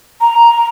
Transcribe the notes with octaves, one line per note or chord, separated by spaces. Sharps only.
A#5